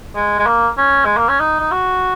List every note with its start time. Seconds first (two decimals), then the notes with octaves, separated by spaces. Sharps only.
0.16 G#3
0.39 G#3
0.46 A#3
0.78 C#4
1.05 G#3
1.17 A#3
1.29 C#4
1.40 D#4
1.60 D#4
1.72 F#4